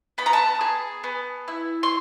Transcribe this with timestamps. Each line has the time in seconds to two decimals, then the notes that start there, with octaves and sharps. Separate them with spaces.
0.18 B3 B5
0.26 A#5
0.33 A5 B5
0.61 G#4
1.04 B3
1.48 E4
1.83 C6